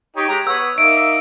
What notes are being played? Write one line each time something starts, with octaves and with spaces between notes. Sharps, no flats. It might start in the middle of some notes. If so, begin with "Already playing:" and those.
D#4 G4 C#5
G#3 G4 A#5
B3 C#5 E6
A#3 D#4 E5 D7